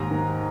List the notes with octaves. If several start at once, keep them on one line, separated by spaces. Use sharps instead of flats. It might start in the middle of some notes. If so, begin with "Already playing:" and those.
Already playing: D#2 G#2 A#5
D#3